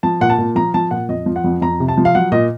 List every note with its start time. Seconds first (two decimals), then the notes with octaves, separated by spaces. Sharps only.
0.03 F3 A5
0.21 A#2 F#5
0.30 A5
0.38 A#2
0.56 F3 A#5
0.74 F3 A5
0.91 A#2 F#5
1.09 F2 D#5
1.26 F3
1.36 F#5
1.44 F2
1.61 F2 A#5
1.80 C3
1.88 A5
1.98 F3
2.05 F5
2.15 F#3 F#5
2.32 A#2 D#5